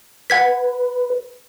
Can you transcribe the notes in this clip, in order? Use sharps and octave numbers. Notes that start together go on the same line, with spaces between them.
B4 F#5 G#6 B6